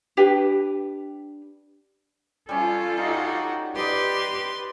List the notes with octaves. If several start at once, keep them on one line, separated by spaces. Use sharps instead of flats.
D4 G4 B4 G5
G3 C#4 F4 A4
D#4 F#4 G4
G4 B4 D5 D#5 C6